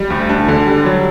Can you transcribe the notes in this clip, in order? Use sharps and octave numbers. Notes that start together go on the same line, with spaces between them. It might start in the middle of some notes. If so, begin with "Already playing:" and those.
Already playing: G3
D2
D4
D3
G3
F#3